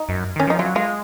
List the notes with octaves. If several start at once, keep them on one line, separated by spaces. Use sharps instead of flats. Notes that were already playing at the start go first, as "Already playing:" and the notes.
Already playing: D#4
F#2
D#3 C#4
F3 D#4
F#3 F4
G#3 F4